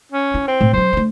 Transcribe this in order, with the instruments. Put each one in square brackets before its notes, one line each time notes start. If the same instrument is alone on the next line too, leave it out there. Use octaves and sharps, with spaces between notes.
[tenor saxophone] C#4
[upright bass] E4
[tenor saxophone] C4
[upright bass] A2
[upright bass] F#3 C#4 [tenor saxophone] C5
[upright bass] A3 D4